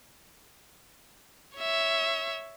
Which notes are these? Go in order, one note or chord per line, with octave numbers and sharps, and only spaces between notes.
C#5 E5